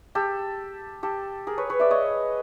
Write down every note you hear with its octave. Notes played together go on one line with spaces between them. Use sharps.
G4 A4
G4 A4
G#4 A#4
B4 C#5
B4 C#5
D5 E5
C#5 D#5